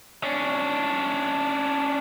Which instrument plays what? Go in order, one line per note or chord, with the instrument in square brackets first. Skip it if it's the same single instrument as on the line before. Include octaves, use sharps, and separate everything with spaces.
[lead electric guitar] C#4 D4